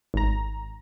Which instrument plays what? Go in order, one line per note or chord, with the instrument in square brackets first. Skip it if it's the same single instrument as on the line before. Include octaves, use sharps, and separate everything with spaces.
[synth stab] G#1 A#5